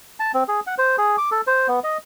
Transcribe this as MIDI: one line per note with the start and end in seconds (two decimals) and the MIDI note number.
0.20 0.32 81
0.34 0.44 60
0.48 0.60 68
0.67 0.75 78
0.78 0.96 72
0.98 1.16 68
1.18 1.30 86
1.31 1.41 69
1.47 1.68 72
1.68 1.80 59
1.84 1.98 75